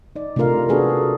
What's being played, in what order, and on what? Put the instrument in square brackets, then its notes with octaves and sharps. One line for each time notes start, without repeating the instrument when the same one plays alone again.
[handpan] D#4 D5
C3 A3 D4 F4 A#4 F5
B3 D4 F#4 G#4 A4 B4